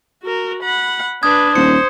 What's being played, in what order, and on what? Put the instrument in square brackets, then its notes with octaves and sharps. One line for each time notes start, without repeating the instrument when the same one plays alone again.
[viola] F#4 A#4
F#5 B5
[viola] D4 B4 [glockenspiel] D#6 G#6
[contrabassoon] D#1 [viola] C5 [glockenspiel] C#7